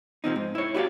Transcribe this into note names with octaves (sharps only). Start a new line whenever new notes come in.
C3 F3 C4 D#4
G#2
E4 C#5
E4 F#4 G4 B4 D5 F5